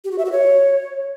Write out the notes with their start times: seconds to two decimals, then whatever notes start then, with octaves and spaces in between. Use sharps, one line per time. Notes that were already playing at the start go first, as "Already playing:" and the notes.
0.05 G4
0.11 F#4
0.18 E5
0.25 F#4
0.32 C#5